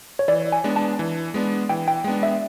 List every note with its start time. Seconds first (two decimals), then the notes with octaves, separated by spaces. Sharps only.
0.19 C#5
0.28 E3 D5
0.52 G#5
0.64 G#3 B3 D4
0.76 A5
0.99 E3
1.34 G#3 B3 D4
1.69 E3 G5
1.88 G5
2.04 G#3 B3 D4
2.23 E5